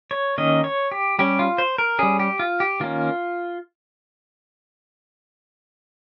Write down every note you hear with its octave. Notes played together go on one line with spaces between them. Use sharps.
C#5
D#3 A#3 C#4 D#5
C#5
G4
G3 C#4 G4
F4
C5
A#4
G3 C#4 G#4
G4
F4
G4
D#3 A#3 C#4 F4